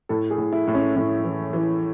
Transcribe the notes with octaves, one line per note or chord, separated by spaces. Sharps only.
A2 A4
G#4
A2
E4
A2
C#4
A2 C#4
E3
E3